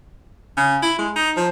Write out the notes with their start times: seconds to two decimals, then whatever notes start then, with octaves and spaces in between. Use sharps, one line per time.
0.57 C#3
0.82 E4
0.98 G#3
1.16 D#4
1.37 F3